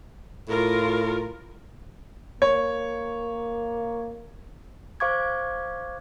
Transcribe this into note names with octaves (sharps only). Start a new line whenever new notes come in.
A2 F4 A#4
A#3 C#5
C5 F5 C#6 D6 G#6